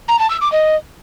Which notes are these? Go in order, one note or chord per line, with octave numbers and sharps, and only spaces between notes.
A#5
A5
E6
D6
D#5